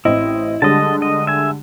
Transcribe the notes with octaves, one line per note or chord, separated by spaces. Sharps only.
A1 C4 E4 D#5
D3 G3 G#3 D#5 A5
D#5
E5 G#5